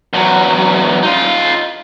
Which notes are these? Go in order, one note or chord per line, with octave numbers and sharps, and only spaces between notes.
E2 F#3
D#4 F4